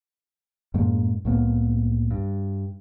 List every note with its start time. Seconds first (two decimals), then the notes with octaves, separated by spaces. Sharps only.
0.74 F#2 A2 G#3 A#3
1.25 C2 A2 A#3 B3
2.11 G2